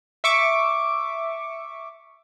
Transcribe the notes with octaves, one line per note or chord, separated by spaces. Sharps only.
E5 C#6 D6